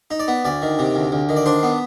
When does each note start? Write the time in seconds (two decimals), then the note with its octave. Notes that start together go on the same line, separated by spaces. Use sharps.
0.11 D#4
0.19 D5
0.28 B3
0.45 D2 D5
0.62 D#3
0.79 C3
0.95 D2
1.12 D2
1.29 D#3
1.36 D5
1.46 D4 C5
1.63 B3